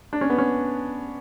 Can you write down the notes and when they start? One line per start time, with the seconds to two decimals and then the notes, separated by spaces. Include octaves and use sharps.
0.13 D4
0.21 C#4
0.30 B3
0.38 C#4